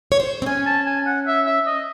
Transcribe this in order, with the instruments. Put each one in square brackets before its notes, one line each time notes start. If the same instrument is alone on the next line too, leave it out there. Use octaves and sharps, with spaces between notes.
[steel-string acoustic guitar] C#5
C5
C4
[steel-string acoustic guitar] C#4 [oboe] G#5
[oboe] A5
G#5
F#5
E5
E5
D#5